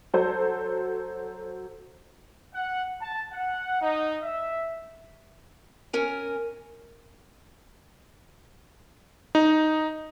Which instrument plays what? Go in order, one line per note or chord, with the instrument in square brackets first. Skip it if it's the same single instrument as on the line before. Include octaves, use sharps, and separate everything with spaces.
[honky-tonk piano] F#3 A4 C5
[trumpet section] F#5
A5
F#5
D#4
E5
[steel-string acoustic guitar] C#4 A#4 G#5
[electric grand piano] D#4